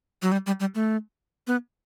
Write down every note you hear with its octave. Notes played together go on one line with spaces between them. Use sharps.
F#3
G3
G3
G3
A3
B3